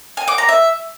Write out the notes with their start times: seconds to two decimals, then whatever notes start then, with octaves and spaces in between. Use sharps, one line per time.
0.17 G#5
0.28 D6
0.38 A#5
0.48 E5